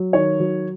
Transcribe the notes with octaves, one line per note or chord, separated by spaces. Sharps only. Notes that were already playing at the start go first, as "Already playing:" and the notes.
Already playing: F#3
D#3 C#5
F#3